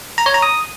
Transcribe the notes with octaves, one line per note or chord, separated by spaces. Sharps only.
A#5
C#5
A#5
D#6